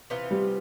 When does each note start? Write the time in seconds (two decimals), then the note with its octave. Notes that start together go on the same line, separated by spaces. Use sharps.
0.10 C3 E3 B3 F4
0.31 G3